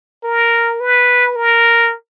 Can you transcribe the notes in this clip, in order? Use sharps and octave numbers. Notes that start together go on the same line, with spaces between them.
A#4
B4
A#4